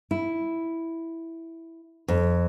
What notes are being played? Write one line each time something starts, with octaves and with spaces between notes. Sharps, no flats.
E4
F2